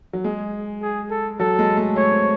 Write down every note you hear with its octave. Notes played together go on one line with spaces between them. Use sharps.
F#3
G#3 G#4
G#4
A4
F#3 A4
G#3
A3
A3 C#5
C4